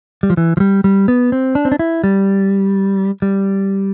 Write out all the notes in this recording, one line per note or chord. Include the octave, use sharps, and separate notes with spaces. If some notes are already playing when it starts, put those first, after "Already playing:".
G3
F3
E3
F3
G3
G3
B3
C4
D4
C4
D4
E4
G3
G3